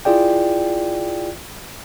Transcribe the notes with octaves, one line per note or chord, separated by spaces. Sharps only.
E4 F4 G#4 D5 G5